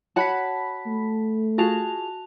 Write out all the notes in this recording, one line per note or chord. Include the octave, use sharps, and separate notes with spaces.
F#4 C#5 F#5 A5 B5 B6
A3
F4 F#4 G#4 A5 F7